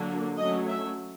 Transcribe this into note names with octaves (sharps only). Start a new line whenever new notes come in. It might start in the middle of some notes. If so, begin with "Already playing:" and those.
Already playing: D3 F#3 A#3 D4
F#3 A3 C#4 D#5
E5